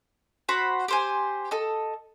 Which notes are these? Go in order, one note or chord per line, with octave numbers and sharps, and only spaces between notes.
F#4 C5 F#5 B5
G4 C5 G#5
A4 D#5